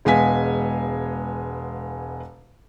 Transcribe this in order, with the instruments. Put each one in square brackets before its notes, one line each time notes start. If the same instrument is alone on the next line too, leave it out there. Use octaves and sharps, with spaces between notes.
[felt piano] E1 G#3 B3 F5 G#5 B6